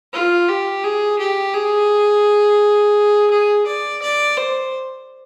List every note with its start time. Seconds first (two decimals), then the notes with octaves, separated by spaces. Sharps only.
0.13 F4
0.48 G4
0.84 G#4
1.19 G4
1.54 G#4
3.30 G#4
3.66 D5
4.02 D5
4.37 C5